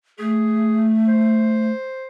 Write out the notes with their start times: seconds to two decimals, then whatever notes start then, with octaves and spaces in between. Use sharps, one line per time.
0.19 A3 G#4
1.08 C5